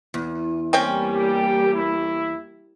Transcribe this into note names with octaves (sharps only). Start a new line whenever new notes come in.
E2
G3 A#3 C4 C#4 G5
G4
E4